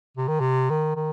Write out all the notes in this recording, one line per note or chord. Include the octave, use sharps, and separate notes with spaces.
C3
D#3
C3
D#3
D#3